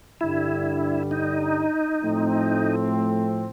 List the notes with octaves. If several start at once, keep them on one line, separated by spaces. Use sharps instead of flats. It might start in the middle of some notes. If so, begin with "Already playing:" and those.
G2 D3 G3 E4
D#4
A2 F3 A3 C4